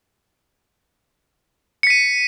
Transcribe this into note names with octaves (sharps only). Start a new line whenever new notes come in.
B6 C#7 D#7